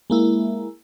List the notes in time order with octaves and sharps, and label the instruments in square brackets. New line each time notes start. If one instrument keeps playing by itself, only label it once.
[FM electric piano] G#3 A#3 E4